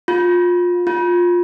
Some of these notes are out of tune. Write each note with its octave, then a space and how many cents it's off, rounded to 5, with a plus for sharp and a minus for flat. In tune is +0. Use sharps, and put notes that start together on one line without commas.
F4 +25
F4 +15